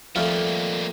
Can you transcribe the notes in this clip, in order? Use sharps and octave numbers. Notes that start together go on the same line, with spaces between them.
F2 G3 A3 A#3 F4